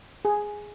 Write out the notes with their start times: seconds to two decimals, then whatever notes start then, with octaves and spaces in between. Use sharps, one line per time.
0.25 G#4